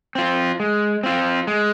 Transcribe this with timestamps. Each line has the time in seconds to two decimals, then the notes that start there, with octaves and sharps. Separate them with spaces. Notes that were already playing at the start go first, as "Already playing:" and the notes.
0.15 C4 F4
0.60 G#3
1.03 C4 F4
1.47 G#3